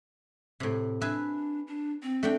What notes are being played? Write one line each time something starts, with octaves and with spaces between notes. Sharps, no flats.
A2 C3
D4 B4 E5 G#5
D4
C4
A3 D4 G5